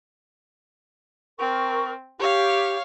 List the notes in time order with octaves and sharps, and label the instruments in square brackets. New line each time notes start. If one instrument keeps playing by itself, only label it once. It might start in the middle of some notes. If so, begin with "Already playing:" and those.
[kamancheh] C4 [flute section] A#4 C#6
[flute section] G4 [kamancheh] C#5 F5